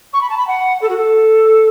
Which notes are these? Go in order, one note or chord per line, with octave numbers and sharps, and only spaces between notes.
C#6
B5
A5
B5
F#5
A4
F#4
A4